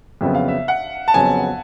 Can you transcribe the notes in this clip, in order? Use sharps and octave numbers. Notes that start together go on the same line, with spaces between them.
F2 C#3 F#3 B3 E5
F5
E5
F#5
A5
F2 C#3 F#3 B3 G#5